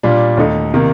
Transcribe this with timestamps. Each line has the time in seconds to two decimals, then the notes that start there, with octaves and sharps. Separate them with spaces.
0.03 A#2 G3 D4 F4
0.37 D#2 D3 A3 D#4
0.74 C3 D#3 A#3